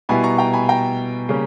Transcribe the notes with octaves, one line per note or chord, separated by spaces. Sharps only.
B2 G3 B3 E4 G#5 B5
A#5 C#6
G5 A#5
G#5 B5
G5 A#5
C#3 G3 A#3 C#4